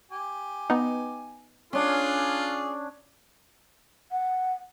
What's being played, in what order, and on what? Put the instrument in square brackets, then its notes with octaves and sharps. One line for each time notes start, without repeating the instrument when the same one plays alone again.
[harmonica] G4 G#5
[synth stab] B3 D#4
[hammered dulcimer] C#4 D4 [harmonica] F4 G#4
[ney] F#5